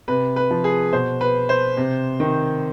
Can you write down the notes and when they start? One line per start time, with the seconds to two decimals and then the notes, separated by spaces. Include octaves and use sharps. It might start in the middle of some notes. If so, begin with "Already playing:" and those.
0.08 C3 B4
0.36 B4
0.51 F3
0.64 G#4
0.93 B2 C5
1.21 B4
1.49 C5
1.77 C3
2.20 D#3